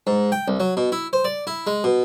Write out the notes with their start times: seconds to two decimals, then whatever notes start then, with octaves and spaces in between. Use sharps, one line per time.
0.07 G#2
0.32 G5
0.48 C2
0.60 F#3
0.77 B2
0.92 E4
1.13 C5
1.25 D5
1.47 E4
1.67 G#3
1.84 B2